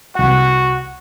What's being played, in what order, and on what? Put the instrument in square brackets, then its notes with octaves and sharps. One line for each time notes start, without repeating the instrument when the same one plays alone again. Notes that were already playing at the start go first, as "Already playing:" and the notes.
[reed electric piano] C2 F#5 [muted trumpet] F#4